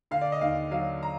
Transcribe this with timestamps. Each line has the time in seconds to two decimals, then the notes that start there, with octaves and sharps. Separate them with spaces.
0.11 D3 F5
0.21 D5
0.32 D#5
0.41 D#2 F5
0.71 F#3 F5
1.03 A#5